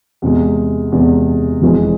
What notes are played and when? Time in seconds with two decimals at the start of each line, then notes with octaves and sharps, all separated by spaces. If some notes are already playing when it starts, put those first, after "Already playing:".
0.22 E2 C3 G#3
0.92 E2 C3 G#3
1.62 F1 F2 E3 G#3